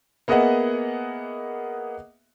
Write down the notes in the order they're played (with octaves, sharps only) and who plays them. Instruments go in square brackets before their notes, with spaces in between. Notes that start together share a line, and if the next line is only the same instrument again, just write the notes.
[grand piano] A#3 B3 G#4 D#5 E5 F#5